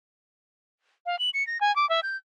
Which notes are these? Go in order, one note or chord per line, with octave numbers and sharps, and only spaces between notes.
F5
F#7
C#7
A#6
G#5
D6
E5
G6